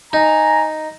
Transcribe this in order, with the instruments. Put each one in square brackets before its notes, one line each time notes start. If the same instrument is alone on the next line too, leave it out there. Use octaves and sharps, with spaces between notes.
[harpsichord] D#4 [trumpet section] G#5 A#5